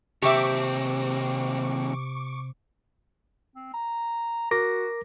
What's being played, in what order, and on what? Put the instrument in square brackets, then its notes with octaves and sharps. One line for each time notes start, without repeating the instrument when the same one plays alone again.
[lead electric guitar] D#2 C4 [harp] C3 [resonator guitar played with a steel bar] G4 E5 [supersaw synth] C#6 D6
[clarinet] C4
A#5
[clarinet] F#4 [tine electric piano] A#4 D6 A#6